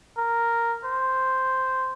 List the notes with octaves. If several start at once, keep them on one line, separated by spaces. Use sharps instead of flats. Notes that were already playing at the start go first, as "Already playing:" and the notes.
A#4
C5